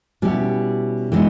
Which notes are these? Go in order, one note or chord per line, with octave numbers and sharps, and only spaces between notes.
B2 G3 C#4 E4 G4
E3 G#3 B3 D#4